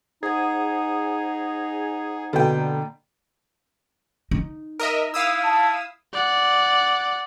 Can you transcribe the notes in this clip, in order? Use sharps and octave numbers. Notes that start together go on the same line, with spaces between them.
D#4 G#4 C5 F#5 D#6
B2 D3 A#3 G5 A#5
D#4
A#4 D#5 E5
E4 F5 D#6 E6
A5
D5 F#5